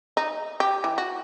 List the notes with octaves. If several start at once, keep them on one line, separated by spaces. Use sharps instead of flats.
D#4
G4
E3
F#4